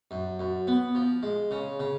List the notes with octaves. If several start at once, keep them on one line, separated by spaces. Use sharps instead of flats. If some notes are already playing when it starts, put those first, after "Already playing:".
F#2
F#2
B3
F3
G#3
C#3
C#3